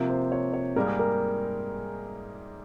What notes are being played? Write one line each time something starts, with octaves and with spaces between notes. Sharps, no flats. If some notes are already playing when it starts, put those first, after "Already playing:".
Already playing: C3 F3 A#3
C5
C#5
C#5
G#2 G3 A#3 A#4
G#4
A#4